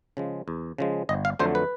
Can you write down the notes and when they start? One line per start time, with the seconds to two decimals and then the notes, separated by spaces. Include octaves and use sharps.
0.17 C#3 F3 G#3
0.48 E2
0.78 C#3 F3 G#3
1.09 G1 D#5
1.25 F5
1.39 F2 D3 F#3 A3 C5
1.55 B4